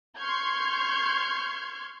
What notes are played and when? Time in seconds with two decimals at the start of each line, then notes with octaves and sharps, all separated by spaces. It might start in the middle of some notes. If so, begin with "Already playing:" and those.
0.18 C6 C#6 F6 G6 G#6